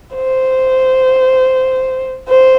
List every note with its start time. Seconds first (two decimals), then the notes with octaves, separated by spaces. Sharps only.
0.15 C5
2.29 C5